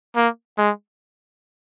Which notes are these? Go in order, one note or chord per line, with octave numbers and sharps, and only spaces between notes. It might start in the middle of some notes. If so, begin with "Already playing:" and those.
A#3
G#3